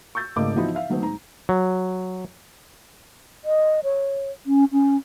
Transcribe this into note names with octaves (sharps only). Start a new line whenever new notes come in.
C#6 E6 G6 A6
G#1 C#3 A3 A#3 D#5 D6
E3 F3 B3 D#4 E4 F#4
E5 F5
D#3 F#3 A3 B3 C4
G#2 A#5
F#3
D#5
C#5
C#4
C#4